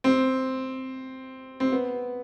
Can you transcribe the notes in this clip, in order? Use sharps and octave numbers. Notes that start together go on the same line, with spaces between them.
C4
C4
B3